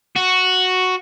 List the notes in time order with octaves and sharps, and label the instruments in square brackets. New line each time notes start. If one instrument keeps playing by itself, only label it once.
[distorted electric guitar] F#4